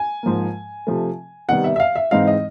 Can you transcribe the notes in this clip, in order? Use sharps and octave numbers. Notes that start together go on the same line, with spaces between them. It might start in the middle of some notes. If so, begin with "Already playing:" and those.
Already playing: G#5
G#2 F3 A#3
C3 F3 A3
C3 D#3 G3 B3 F#5
E5
E5
F5
E5
G#2 E3 G#3 C4 D#4 F5
D#5